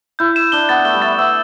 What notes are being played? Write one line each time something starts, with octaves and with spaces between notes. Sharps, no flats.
E4 G6
E7
D4 G7
B3 A6
A3 G7
G3
A3 A6
B3 E6